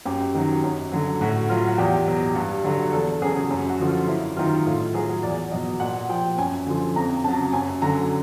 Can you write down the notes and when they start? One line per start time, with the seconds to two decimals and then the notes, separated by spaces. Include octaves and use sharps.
0.05 F#2 G4
0.35 D#3 F#3
0.63 F#2
0.92 D3 F#3
1.21 A2 F#4
1.49 F#3 F4
1.67 F#4
1.78 E2 G4
2.07 B2 F#3
2.35 G2
2.64 D3 F#3
2.93 E2 A4
3.22 C#3 F#3 G#4
3.50 F#2
3.69 F#4
3.80 D3 F3
3.88 F4
4.07 F#2 E4
4.37 D#3 F#3 F4
4.65 A2 F4
4.94 F#3 G#4
5.23 E2 D5
5.51 B2 F#3 D#5
5.80 A#2 F#5
6.09 F3 G5
6.38 F#2 G#5
6.66 D3 F3
6.96 F2 A#5
7.24 C#3 F#3 A5
7.53 F#2 G#5
7.82 D3 F#3 A#5